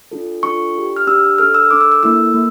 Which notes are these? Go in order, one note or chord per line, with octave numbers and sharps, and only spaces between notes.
D4 F4 A4
D4 F4 A4 C#6
D4 G4
F6
D4 G4 E6
D4 A4 F6
E6
D4 A4 D6
E6
E6
A#3 E4 A4 E6
A#3